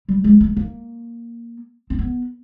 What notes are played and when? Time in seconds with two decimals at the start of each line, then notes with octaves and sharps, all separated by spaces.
0.08 G3
0.24 G#3
0.41 A3
0.56 A#3
1.90 C4
1.99 B3